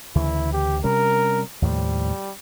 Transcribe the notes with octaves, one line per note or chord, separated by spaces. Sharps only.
D2 C#3 E3 E4
G4
C3 G3 C#4 A#4
D#2 A2 F3 G3